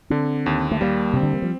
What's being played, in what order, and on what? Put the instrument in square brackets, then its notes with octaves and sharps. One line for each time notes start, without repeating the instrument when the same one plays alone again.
[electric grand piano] D3 [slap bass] C4
[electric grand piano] D#2
[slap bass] A3
[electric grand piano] G3 [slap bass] A#3
[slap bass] C3 [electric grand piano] C4
[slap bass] D3
D#3
F3